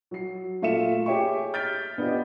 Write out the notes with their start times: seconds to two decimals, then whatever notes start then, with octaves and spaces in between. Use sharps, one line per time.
0.11 F#3 C7
0.62 A#2 A3 F4 E5 C#7 E7
1.06 G4 G#4 C#5 E5 G5 C#6
1.54 F6 G6 A6 B6 D7 G7
1.98 B3 D4 F4 G4 D#5